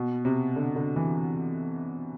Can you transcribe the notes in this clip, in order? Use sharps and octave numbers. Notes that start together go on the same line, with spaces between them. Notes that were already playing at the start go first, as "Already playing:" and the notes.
Already playing: B2
C3
D3
D3
E3